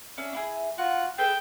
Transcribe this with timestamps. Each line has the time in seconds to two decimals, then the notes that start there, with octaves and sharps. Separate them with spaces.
0.18 C#4 D4 E5
0.32 D4 E4 G#4
0.78 F4 F#4 F#6
1.18 G#4 A4 B4 G5